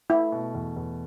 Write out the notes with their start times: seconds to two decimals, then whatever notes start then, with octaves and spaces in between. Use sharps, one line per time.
0.09 A3 E4
0.32 B2
0.54 E2
0.76 E2